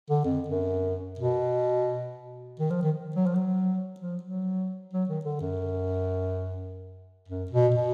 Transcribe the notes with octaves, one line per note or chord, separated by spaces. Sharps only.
D3
F2
F#2
B2
D#3
F3
D#3
F#3
F3
F#3
F3
F#3
F#3
D#3
D3
F#2
F#2
B2
B2